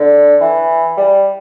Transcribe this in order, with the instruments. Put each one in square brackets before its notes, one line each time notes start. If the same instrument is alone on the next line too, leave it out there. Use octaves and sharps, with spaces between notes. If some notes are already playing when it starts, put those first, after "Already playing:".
Already playing: [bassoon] D3
E3
G3